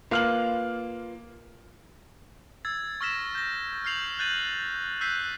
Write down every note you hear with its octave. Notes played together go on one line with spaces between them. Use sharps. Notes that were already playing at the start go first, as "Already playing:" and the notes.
A#3 F4 B4 F5 F6 F#7
E6 G#6 A6
C#6 E6 F6 A#6 B6 E7
G6 A#6
F6 G6 C7 F7 F#7
F#6 G6 A6 D#7 F#7
E6 F#6 G6 B6 C7 D#7